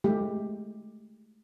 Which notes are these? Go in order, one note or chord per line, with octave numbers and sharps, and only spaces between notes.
G#3 A3 G4